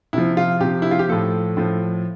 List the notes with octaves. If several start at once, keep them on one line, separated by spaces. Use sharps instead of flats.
C3 F3 E4
F4
C3 F3 G4
E4
F4
G4
A2 F3 A4
A2 F3